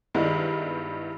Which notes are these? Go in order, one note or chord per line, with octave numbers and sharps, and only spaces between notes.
G2 D#3 G3 G#3 B3 E4